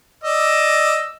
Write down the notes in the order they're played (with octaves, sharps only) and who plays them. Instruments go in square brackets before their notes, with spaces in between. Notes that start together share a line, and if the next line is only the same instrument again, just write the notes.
[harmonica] D5 D#5 E6